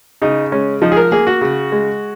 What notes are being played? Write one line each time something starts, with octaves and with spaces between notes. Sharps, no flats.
C#3 D#4
G#3 C#4
F3 D#4
G#4
A#4
A#3 G#4
F#4
C#3
G#3